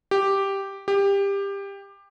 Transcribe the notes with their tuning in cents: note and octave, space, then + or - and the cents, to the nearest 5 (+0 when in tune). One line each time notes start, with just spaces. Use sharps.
G4 +0
G4 +20